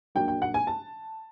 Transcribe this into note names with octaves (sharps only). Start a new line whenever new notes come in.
A#1 A#2 F#3 A#3 D4 G5
G5
F#5
G#5
A5